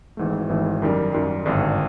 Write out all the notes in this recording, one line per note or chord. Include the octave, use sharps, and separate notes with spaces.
G#1 G#2 E3 A3
G#1 G#2 E3 A3
F#2 D#3 G3
F#2 D#3 G3
G#1 G2 D3